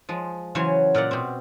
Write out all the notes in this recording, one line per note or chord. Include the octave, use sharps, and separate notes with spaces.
F3 G#3
C#3 E3 F#3 C5 C#5 G#5
A#2 A#4 D5 F#5
B2 C4